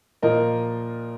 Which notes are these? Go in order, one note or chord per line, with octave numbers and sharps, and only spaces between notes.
A#2 F3 A#3 A#4 D#5